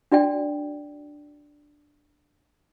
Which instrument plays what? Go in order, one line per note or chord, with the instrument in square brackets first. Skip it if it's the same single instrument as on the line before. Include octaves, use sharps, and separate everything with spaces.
[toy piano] D4 F#4 D5 G5